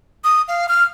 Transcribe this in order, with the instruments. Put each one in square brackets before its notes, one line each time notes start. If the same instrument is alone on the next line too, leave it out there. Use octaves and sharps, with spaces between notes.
[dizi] D#6
F5
F6